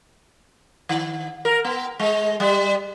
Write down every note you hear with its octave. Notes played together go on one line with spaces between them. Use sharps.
D#3
A#4
B3
G#3
G3